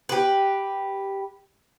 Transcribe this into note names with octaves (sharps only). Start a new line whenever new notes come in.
G4 B4